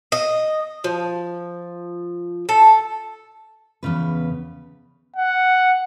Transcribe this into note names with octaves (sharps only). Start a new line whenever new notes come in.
D#5
F3
A4
E2 G2 C#3 B4
F#5